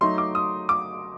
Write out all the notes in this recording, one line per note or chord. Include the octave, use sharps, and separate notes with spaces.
F#3 A3 D#4 C6
D6
D#6
D6